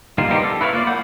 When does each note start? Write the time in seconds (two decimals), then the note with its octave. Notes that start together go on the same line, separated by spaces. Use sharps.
0.18 D#3 G3 A#3 F4
0.30 G3 B3 D#4 G4 C5
0.44 A4
0.61 E4 B4 C#5 D5 F5
0.73 A#3 F4 D5
0.87 F#5 B5 G6